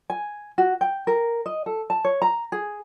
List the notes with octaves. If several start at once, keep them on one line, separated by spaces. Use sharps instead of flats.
G#5
F#4
G5
A#4
D#5
A4
A5
C#5
A#5
G#4